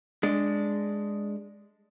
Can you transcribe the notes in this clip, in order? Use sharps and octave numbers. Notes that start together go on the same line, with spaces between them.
G#3 D4